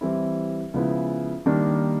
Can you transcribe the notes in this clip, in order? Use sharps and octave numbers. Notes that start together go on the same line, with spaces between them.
E3 G3 C4 E4
C#3 F3 G#3 B3 E4
D#3 G3 A#3 D4